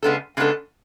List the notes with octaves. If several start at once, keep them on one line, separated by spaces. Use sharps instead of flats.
C#3 G#3 B3 D4 A4
C#3 G#3 B3 D4 A4